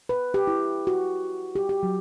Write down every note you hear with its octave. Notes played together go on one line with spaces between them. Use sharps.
B4
G4
E4
F#4
G4
G4
F#3